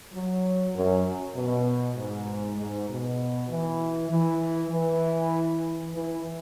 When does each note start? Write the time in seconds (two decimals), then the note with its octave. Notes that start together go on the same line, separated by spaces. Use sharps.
0.13 F#3
0.74 F#2
1.35 B2
1.96 G#2
2.57 G#2
2.88 B2
3.50 E3
4.10 E3
4.71 E3
5.94 E3